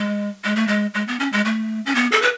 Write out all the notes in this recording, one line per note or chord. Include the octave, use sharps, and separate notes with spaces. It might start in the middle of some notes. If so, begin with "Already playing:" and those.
Already playing: G#3
G#3
A3
G#3
G#3
B3
C#4
G#3
A3
C#4
B3
A4
B4